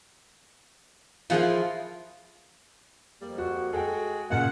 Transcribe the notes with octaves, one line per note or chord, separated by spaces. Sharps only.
F3 E4 F4 G#4 A#4 F#5
F2 G3 A#3
F#4
G#3 F#4 A4 G5
A#2 C#3 A#3 F#5